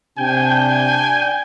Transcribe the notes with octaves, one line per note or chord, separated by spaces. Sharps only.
C3 D4 G5 G#5